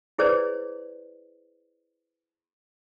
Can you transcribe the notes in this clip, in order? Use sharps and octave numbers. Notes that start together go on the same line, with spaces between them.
E4 G#4 B4 C5 D5